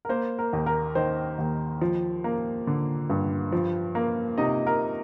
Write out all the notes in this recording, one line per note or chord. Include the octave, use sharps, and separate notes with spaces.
A#4
A#3 C5
A#4
D#2
A#4
D#3 C5
D#2
F3
A#3
D3
G2
F3
A#3
C3 D#4 D#5
A#4